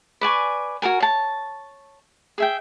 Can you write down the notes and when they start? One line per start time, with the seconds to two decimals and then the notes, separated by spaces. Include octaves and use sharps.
0.21 B4 D5 G#5 C#6
0.82 F#4 G#4 A#4 G#5
1.00 C#5 A5
2.38 G#4 E5 G5